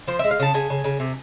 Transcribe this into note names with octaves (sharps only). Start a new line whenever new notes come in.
F3 C5
G#3 E5
F5
C#3 A5
C#3 G#5
C#3
C#3
C3